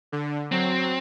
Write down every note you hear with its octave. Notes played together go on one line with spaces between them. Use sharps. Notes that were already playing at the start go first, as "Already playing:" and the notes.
D3
F#3 C4